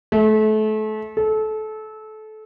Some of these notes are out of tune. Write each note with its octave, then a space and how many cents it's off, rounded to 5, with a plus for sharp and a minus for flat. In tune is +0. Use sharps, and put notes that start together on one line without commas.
A3 -30
A4 -25